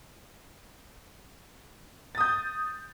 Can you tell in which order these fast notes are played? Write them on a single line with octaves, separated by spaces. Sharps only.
A6 D#6 G6